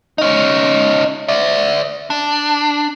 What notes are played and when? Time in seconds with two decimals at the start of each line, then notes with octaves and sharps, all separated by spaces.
0.18 C#4 D#4
1.28 D5 E5
2.10 D4